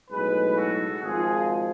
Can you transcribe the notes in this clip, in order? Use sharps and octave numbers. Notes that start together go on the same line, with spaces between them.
B1 A2 G#3 G#4 B4
F#4 A4
G#1 G#2 F3 F4 G#4